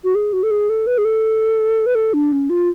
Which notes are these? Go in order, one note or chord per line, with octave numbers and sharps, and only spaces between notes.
F#4
G#4
F#4
A4
G#4
A4
B4
G#4
A4
B4
A4
D4
C#4
F4